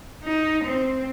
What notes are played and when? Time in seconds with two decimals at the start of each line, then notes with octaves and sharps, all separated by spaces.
0.24 D#4
0.64 C4